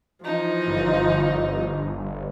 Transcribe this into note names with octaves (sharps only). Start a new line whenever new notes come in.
E3 F3 D#4
G1